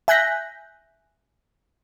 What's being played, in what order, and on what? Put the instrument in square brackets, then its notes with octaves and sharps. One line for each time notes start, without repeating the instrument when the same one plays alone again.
[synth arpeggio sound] E5 G#5 F#6 G6 A#6 B6